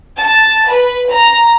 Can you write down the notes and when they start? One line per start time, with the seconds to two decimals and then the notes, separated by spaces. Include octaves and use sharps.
0.18 A5
0.69 B4
1.11 A#5